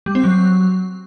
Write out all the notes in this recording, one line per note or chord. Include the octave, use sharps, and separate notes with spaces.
G3
C4
F#3